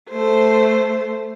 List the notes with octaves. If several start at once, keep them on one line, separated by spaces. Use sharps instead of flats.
A3 C5